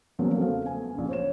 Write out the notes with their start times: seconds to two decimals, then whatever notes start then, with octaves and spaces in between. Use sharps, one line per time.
0.19 E2 C#3 F3 F#3 A#3
0.38 A3 B3 C5 F5
0.66 G#5
0.95 A#1 C#3
1.08 C5 C#5 E7